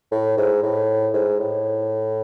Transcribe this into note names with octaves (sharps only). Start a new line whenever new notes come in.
A2
G#2
A2
G#2
A2